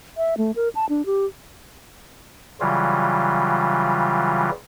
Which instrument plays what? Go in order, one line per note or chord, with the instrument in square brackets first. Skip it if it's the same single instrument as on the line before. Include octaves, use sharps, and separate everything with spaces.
[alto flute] E5
A3
A#4
A5
D4
G4
[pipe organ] C#3 E3 F#3 G3 F4